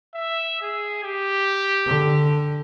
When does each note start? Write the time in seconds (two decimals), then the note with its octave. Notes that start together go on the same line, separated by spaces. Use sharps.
0.15 E5
0.62 G#4
1.04 G4
1.86 D3